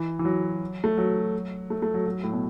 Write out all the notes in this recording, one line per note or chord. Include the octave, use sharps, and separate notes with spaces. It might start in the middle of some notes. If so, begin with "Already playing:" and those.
Already playing: E3
E3
F#3
A3
F#3
A3
A3
F#3
F#3
A2
B2